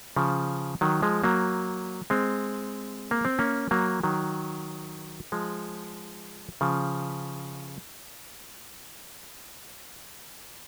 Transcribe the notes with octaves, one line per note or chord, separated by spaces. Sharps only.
C#3 F3
D#3 F#3
F3 G#3
F#3 A#3
G#3 C4
A#3
C4
A#3 C#4
F#3 A#3
D#3 F#3
F3 G#3
C#3 F3